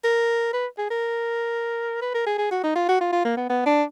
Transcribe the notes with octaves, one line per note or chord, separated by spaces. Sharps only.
A#4
B4
G#4
A#4
B4
A#4
G#4
G#4
F#4
D#4
F4
F#4
F4
F4
A#3
B3
B3
D4